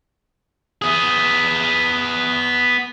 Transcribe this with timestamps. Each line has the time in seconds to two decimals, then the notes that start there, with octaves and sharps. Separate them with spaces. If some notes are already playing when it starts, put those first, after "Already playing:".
0.82 B3 G#4